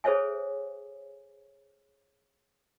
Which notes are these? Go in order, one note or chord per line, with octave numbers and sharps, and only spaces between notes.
G#4 A4 C5 C#5 E5 G#5